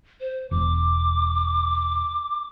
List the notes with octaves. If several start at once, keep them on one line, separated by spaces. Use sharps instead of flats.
C5
E1 D6